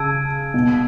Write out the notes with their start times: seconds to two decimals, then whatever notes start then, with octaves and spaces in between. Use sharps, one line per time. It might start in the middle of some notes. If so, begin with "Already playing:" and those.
Already playing: C#3 A5 E6 G#6 D7
0.54 B2